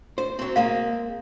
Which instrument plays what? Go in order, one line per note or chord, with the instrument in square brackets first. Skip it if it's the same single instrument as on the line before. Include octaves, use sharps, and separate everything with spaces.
[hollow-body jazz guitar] C5
F#3 C4
[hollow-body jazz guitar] G#3 A#3 C4 [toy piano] F5